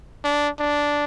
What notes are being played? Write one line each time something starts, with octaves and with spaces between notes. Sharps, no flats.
D4
D4